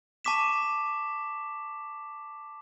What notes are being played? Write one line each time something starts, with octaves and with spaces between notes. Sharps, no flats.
A5 C#6 D6 B6 E7